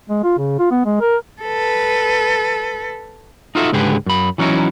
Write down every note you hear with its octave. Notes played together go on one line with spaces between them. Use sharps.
G#3
F4
C#3
F4
B3
G#3
A#4
A4 B4
D#4 F4 F#4 A4 E5
C#2 G#2 D3 G4 G#4 B4
F#2 B5
E3 F#3 C#4 D#4 E4